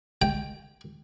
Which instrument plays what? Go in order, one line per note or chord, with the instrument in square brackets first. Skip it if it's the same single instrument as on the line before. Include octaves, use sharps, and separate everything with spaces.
[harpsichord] G5